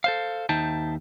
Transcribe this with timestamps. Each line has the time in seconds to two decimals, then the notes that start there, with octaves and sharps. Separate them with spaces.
0.04 A4 C5 F5
0.49 D#2 D#4 C5 E5 G5 A5